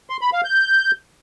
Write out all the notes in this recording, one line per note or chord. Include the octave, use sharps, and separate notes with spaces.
C6
B5
F5
G6